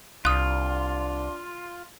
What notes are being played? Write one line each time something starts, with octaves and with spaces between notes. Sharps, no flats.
C2 D4 F4 D#6 F#6